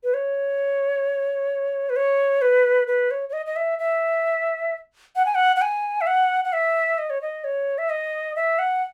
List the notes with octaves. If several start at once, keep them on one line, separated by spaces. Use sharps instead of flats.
B4
C#5
B4
C#5
B4
B4
C#5
C#5
D#5
D#5
E5
E5
F#5
G#5
F#5
F#5
G#5
E5
F#5
F#5
E5
D#5
C#5
D#5
C#5
E5
D#5
E5
F#5